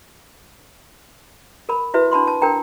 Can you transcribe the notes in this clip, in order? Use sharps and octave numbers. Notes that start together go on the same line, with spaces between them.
A#4 B5
E4 F#4 B4 E5
D4 A5 B5 C6
A5
D4 A#4 G5 A#5